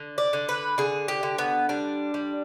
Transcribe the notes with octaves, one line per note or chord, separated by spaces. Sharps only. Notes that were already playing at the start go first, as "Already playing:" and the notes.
Already playing: D3
D5
D3
B4
D3 G#4
G4
D3
B3
G3 D4
G3